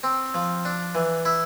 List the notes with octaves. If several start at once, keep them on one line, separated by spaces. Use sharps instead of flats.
C4
F3
D4
E3
E4